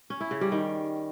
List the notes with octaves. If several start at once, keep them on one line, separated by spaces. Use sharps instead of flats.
C#4
E4
C#3
G3
D#3